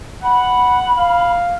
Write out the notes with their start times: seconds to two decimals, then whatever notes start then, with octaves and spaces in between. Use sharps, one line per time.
0.23 F#5 B5
0.97 F5